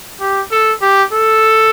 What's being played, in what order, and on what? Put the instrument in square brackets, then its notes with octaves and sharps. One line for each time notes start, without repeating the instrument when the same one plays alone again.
[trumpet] G4
A4
G4
A4